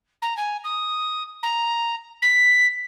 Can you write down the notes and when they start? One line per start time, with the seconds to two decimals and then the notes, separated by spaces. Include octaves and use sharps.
0.22 A#5
0.36 G#5
0.64 D#6
1.42 A#5
2.22 B6